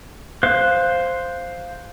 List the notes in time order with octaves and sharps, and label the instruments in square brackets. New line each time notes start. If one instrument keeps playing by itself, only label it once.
[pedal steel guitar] C5 F5 F#6